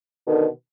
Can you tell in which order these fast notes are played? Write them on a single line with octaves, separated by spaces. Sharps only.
B2 D#3 D3